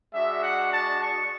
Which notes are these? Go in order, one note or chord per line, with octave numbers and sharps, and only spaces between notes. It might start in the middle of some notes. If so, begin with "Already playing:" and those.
G#3 D4 F#4 E5
F#5
A5
C#6